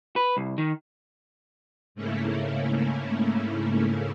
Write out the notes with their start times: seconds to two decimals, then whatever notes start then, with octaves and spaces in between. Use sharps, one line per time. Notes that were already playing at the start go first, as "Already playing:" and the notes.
0.16 B4
0.37 C2
0.58 D#3
1.95 G#2 C#3 A3 A#3 C#4 E4